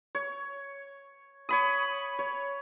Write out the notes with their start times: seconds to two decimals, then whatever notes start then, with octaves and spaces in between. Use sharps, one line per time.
0.15 C#5
1.49 C#5 B5 D#6
2.19 C#5